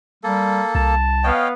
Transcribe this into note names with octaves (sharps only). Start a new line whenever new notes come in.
G3 A#3 A4
C2 A5
B3 C#5 D#5 F5 G5